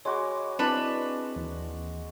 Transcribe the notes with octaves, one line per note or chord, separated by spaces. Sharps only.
G#3 F#4 C#5 G#5 B5 D6
C4 D4 E4 B4 D5
D#2 E3